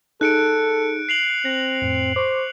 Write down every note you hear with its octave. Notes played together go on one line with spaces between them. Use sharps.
D#4 G#4 A4 F#6 C#7 D7
C7 F7 F#7
C4 A#6
F2 A2
C5 C#6 D6